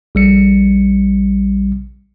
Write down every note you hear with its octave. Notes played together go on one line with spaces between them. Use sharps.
A#1 G3 C#7